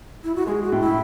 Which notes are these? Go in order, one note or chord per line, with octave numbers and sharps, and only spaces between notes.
E4
F#4
G#3 G#4
F#4
A2
E4